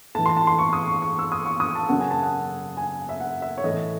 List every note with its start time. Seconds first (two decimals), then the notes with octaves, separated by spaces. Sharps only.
0.15 A2 E3 A5
0.26 C6
0.37 A5
0.47 C6
0.58 C#6
0.73 D#6
0.87 C#6
1.02 C#6
1.19 E6
1.32 D#6
1.46 C#6
1.60 D#6
1.75 A5
1.89 F#2 C#3 F#3 F#5
2.00 G#5
2.11 A5
2.22 F#5
2.77 G#5
3.09 E5
3.20 F#5
3.42 E5
3.58 C#5
3.64 A2 E3 D#5